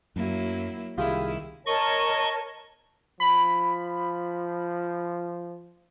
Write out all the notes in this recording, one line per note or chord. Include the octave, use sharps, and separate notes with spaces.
F#2 F#3 A#3 E4
C2 D#3 E4 F4 G4 G#4
A#4 C#5 D#5 A5 C#6
F3 B5